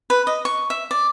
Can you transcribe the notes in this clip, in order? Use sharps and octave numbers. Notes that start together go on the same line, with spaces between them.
B4
D#5
C#6
E5
D5